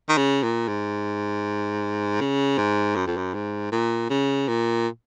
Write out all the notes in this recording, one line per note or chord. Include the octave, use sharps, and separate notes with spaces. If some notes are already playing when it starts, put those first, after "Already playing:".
D#3
C#3
A#2
G#2
C#3
G#2
F#2
F2
F#2
G#2
A#2
C#3
A#2